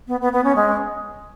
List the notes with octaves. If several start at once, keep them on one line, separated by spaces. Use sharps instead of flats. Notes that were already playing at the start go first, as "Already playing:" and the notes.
B3
B3
B3
C#4
G#3